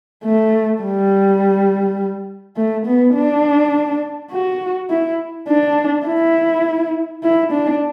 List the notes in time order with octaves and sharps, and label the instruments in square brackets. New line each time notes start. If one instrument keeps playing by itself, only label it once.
[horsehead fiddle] A3
G3
A3
B3
D4
F#4
E4
D4
E4
E4
D4